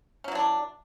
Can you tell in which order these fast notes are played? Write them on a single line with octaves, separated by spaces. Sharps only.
C#4 F#3 E3 D4